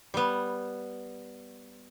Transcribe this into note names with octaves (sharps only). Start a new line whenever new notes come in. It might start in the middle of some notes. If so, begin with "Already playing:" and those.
G3 B3